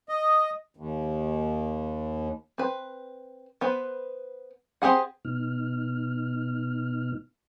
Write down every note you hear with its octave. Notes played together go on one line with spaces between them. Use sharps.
D#5
D#2
C4 B4
B3 B4 C5
C4 G4 G#4 F#5
B2 B3 D#4 F6